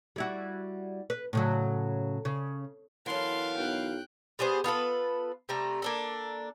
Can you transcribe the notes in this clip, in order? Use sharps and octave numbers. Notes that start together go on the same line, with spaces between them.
G3 E4 F#4
B4
A2 C#3 F#3
C#3
E3 F#3 B3 A4 A#4 F5 C6
B1 G5 F#6
G3 B3 G#4 C5
B3 F4 A4 B4
C3 G3 A3 A#5
A#3 D4 A4